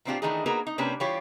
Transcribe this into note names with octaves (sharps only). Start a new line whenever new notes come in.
A#2 E3 C4 D4 F4 G4
D#3 E3 A3 D4 D#4 G#4
A#3 B3 D#4 F#4 G#4 A#4
D#4
C3 A#3 C#4 D4 G4 B4
E3 G3 F4 G4 C#5